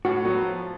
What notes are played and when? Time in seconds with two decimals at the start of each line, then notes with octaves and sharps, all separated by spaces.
0.05 A2 F#4
0.25 F#3 B3
0.45 F3